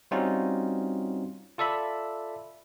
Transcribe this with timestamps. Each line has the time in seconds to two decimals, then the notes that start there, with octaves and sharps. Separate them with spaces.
0.11 G3 C4 C#4 D#4 F4 F#4
1.58 F4 A4 D5 E5 B5